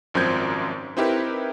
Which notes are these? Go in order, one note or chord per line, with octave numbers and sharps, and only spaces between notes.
G#1 F#2 F3 C4 G6 G#6
C4 D#4 E4 G4 A#4 B4